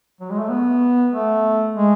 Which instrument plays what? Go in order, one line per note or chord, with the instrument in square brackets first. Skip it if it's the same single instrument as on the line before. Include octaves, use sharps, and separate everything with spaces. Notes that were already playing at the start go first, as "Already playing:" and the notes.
[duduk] F#3
G#3
A3
B3
A3
G#3